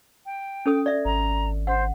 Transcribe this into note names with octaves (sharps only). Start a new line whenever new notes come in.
G5
C#4 A4 D#6
D5 E5
G#1 A#5
C5 F#5